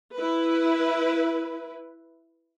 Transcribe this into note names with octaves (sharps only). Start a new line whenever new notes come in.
E4 B4